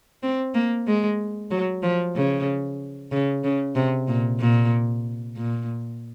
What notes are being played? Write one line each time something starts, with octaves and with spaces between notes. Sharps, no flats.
C4
A#3
G#3
F#3
F3
C#3
C#3
C#3
C3
A#2
A#2
A#2